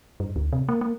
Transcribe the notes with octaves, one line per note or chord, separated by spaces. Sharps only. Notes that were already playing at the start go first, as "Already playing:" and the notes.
G2
D2
C3
A#3
A#3